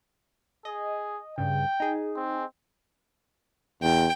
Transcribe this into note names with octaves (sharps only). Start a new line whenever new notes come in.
G#4 D#5
G2 C#3 G5
D#4 G#4
C4
E2 G5